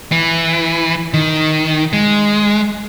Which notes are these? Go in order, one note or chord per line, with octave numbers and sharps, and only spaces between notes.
E3
D#3
G#3